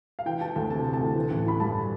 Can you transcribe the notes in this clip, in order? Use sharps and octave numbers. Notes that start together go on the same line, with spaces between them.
F5
E3 G5
E3 A5
D2 A5
C3 A5
C3
A5
D2
E3
A1
E3 B5
G2 A5